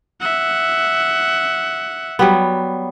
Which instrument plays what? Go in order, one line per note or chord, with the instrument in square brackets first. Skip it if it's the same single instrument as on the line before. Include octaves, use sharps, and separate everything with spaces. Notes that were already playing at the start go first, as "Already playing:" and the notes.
[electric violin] E5 F#5
[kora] F#3 G3 B3